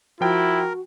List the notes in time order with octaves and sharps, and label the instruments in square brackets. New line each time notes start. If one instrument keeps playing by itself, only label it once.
[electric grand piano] F3 G5 [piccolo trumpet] E4 [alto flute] F#4 [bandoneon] A#4